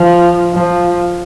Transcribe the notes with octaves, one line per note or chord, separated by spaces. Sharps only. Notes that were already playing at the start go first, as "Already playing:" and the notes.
Already playing: F3
F3